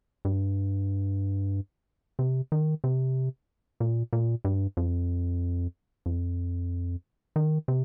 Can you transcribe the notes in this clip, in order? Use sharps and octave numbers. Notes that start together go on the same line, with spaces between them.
G2
C3
D#3
C3
A#2
A#2
G2
F2
F2
D#3
C3